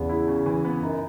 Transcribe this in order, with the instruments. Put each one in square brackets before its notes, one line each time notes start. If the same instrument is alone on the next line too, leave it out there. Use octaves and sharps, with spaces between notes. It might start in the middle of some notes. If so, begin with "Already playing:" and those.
Already playing: [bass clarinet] E2 [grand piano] C#3 E3 B3
[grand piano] E4
C#3
E3
B3
[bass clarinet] F#2 [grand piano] D#4